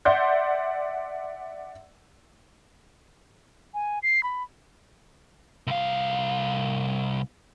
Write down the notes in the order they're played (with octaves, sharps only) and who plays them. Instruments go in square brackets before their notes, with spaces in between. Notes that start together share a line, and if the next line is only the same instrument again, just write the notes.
[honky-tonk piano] D5 E5 F#5 C6 G6
[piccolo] G#5
C7
B5
[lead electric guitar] C2 F5